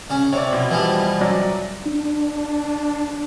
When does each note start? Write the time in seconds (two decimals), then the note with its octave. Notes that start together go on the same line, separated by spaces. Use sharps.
0.10 C#3 C#4
0.33 C3 C#5 D5
0.53 B2
0.71 E3 F3 G3
1.21 F#3 D5
1.85 D4